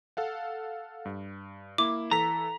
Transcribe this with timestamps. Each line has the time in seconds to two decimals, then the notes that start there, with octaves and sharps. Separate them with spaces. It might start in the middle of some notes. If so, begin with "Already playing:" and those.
0.17 A4 F5 F#5
1.05 G2
1.78 A#3 E4 D6
2.11 E3 A4 A#5 B6